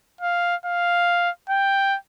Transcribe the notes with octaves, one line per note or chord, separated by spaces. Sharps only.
F5
F5
G5